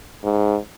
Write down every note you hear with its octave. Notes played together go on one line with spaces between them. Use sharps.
G#2